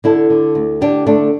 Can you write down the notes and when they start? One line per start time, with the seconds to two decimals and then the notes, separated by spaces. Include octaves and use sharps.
0.04 D3 E4 A4
0.30 D3
0.55 D2
0.81 D3 D4 G4
1.06 D3 A3 D4